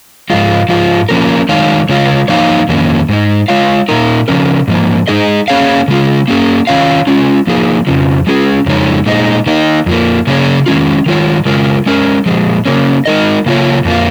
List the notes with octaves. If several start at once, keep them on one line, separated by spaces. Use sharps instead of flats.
G#2 F3 G#3 F4
G#2 F3 G#3 F4
F3 A#3 C#4 A#4
D#3 G#3 D#4 C#5 F5
C#3 G#3 F4 C#5 F5
F3 A#3 D#4 C#5 F5
F2 D#3 A#3 C#4
G#2 G#3 D#4
G#3 F4 C#5 F5
A#2 A#3 D#4 A#4
C#3 F3 C#4 A#4
G#2 F3 A#3
G#3 D#4 G#4 D#5
A#3 C#4 G#4 C#5 F5
C#3 G#3 F4
A#3 C#4 G#4
D#3 C#4 F4 C#5 F5
G#3 C#4 F4
F3 A#3 D#4 G#4
F2 C#3 F3
G#3 C#4 F4 G#4
F2 C#3 G#3 D#4 C#5
A#2 G#3 D#4
D#3 A#3 D#4
F2 F3 A#3
C#3 A#3 C#4 G#4 C#5
D#3 G#3 C#4 F4
D#3 G#3 F4 C#5
C#3 G#3 F4 A#4
G#3 C#4 A#4
A#2 F3 G#3
C#3 A#3 C#4
G#3 D#4 A#4 D#5
C#3 A#3 F4 C#5
F2 F3 A#3 F4